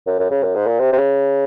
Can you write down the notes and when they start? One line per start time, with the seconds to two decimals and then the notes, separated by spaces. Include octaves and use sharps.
0.07 F#2
0.19 F#2
0.31 C#3
0.43 F#2
0.55 G#2
0.67 A#2
0.79 C3
0.93 C3
0.98 C#3